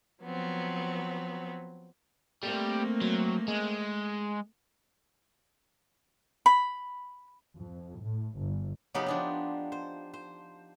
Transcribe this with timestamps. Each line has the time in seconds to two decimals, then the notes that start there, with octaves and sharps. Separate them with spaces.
0.22 F3 F#3 B3 C4
2.43 G3 A3 A#3 C4
3.01 F#3
3.48 G#3
6.46 B5
7.58 F2
8.03 A2
8.38 G1
8.94 C#3 F#3 B3 C#4 D#4 G4
9.06 F3 D4 D#4
9.72 C5
10.14 C5